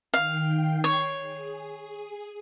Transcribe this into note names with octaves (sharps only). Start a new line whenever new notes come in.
D#3 F5 G5 C7
C#5
G#4